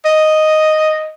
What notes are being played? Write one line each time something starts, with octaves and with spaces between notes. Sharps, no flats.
D#5